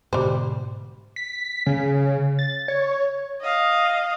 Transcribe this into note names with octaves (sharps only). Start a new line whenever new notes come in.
G#2 B2 D3 G3 C5
B6
C#3
A6
C#5
D#5 F5